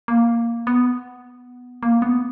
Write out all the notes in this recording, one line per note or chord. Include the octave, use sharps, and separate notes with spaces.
A#3
B3
A#3
B3